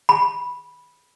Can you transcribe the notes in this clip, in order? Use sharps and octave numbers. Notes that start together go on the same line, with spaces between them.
B5